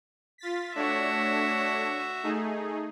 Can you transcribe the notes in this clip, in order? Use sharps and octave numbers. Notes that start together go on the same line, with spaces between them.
F4 A6 B6
A3 D4 F#4 C#5 E5
A3 D#4 G#4